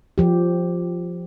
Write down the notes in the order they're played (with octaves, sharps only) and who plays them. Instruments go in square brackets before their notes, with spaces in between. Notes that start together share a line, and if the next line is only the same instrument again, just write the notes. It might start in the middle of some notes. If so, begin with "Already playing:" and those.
[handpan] F3 G4